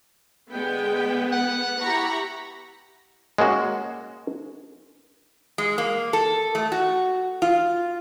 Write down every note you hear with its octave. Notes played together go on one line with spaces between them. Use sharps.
D3 G#3 B3 B4 G5
F#5
E4 G4 A#5 B5 C#6
G#3 A#3 C#4 F#4
G#3
A#3
A4
A3
F#4
F4